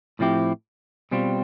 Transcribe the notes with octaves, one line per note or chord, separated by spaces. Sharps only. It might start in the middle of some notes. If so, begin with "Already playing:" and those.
A2 F3 C4 E4 G4
B2 G3 C4 F4